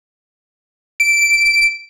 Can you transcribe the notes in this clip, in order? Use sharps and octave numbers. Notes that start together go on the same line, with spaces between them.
D7